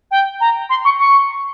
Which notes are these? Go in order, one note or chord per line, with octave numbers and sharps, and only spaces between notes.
G5
A#5
C6
C#6
C#6